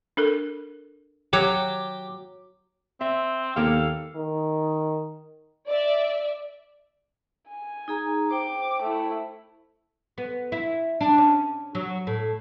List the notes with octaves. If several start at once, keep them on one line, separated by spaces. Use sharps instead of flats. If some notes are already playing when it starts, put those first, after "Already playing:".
D4 A4 A#4
F#3 G4
C4 E5
D#2 A#3 A4 F5 G5
D#3
D5 E5
G#5
D#4 G#4 A#5
C5 G5 D6
A3 E4
B3
E4
D4
C#4
F#3
A2